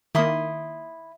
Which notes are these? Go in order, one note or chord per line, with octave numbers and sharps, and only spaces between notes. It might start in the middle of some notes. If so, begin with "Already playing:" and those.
D#3 A#3 E4 C6 D#6